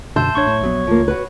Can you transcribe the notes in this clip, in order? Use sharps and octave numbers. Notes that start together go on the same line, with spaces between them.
F#2 B2 D3 E5 A5 C6 G6
A1 D4 C#5 C#6
A2
A#1 F#3 B3
C#2 F3 A#3
F#4 B4